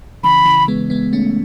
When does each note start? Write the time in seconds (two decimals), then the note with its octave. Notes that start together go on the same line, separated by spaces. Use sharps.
0.23 C#3 E3 B5
0.46 C#3 E3
0.68 G#3 B3
0.90 G#3 B3
1.13 A3 C#4